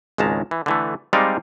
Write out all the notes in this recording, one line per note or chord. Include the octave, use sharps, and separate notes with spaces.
G#1 C#2 G#3 C#4 A5 A#5
E3
D3 E3 A3
G3 G#3 C4 D#4 D5 F5